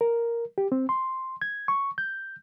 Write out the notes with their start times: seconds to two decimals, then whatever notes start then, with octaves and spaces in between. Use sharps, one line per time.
0.01 A#4
0.58 G4
0.72 C4
0.89 C6
1.42 G#6
1.68 C#6
1.98 G6